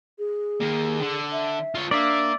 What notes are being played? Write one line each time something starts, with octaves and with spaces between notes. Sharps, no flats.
G#4
D#3 A#3
D3
E5
F4 C#5
A#3 D4 D5 E5